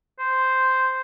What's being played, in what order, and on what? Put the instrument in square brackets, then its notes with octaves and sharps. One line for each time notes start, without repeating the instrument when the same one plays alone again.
[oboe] C5